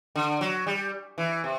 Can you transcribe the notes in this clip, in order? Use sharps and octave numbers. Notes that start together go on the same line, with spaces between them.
D3
F#3
G3
E3
C3